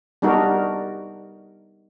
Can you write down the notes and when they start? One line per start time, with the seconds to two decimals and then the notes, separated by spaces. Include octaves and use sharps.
0.22 G3 B3 D4 D#4 F#4 A#4